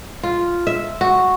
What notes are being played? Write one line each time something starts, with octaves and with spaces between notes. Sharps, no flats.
F4
E5
F#4